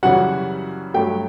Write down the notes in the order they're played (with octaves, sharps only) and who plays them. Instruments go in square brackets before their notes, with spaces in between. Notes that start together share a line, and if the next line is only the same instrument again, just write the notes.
[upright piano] F#2 C#3 E3 G3 F#4 F#5
G2 F#3 A3 G4 G5